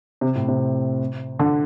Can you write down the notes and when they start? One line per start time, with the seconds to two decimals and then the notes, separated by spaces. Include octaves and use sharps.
0.21 C3
0.35 A2
0.48 C3
1.39 D3